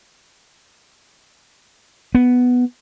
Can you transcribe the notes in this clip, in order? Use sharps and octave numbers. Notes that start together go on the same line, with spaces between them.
B3